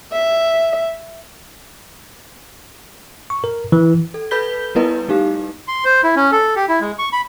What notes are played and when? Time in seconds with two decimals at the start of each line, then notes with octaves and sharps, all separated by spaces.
0.12 E5
3.30 C#6
3.44 A#4
3.72 E3
4.14 A4
4.31 A4 B4 B5 G6 B6 G7
4.75 G3 B3 E4 A#4 B4 D#5
5.08 A3 D#4 G4 F5
5.68 C6
5.85 C5
6.03 E4
6.16 C#4
6.32 A4
6.56 G4
6.69 E4
6.81 G#3
6.99 C#6
7.13 B5